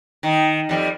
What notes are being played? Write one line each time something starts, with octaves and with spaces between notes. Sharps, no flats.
D#3
F2 G3